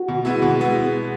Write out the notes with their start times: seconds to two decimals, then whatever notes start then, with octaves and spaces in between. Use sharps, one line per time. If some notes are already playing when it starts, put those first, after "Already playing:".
Already playing: F#4
0.08 B2
0.25 G#3 B3 E4
0.42 B2
0.59 G#3 B3 E4